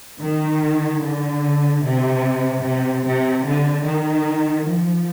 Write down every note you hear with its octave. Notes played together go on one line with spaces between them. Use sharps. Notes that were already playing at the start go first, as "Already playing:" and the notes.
D#3
D3
C3
C3
C3
D3
D#3
F3